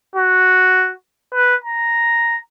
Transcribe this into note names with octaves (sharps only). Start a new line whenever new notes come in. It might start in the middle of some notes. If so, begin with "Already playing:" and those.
F#4
B4
A#5